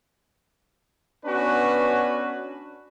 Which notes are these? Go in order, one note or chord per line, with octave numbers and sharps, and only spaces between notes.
B3 C#4 D4 F#4 B4